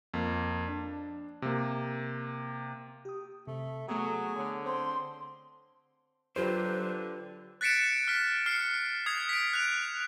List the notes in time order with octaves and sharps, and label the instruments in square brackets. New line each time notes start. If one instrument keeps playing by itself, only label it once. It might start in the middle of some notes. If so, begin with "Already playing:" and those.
[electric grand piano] F2 A#3
D4
C3 A#3
[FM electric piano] G4 D#6
[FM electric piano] C3 [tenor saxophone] A3
[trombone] F#3 [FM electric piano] A3 B3 A4 [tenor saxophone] G#4
[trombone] D3 [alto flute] C#5
[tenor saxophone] C4 [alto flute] C6
[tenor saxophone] D3 [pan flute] F#3 [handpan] F4 G4 B4 [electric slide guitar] C5
[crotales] F#6 A6 B6 C#7 D7 E7
F6 B6
F6 C7 C#7
D#6 G#6 C7
B6 D7
F#6 F7